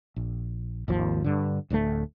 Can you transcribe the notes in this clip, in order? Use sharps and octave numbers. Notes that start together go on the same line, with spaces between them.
A#1
G#1 D#2 F3
G2 D3
D1 D2 D#3 A3